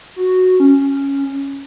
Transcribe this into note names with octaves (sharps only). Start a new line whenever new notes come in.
F#4
C#4